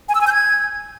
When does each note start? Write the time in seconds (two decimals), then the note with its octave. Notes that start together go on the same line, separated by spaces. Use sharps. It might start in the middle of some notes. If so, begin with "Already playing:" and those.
0.09 G#5
0.15 E6
0.21 G#5
0.27 G6
0.33 G#6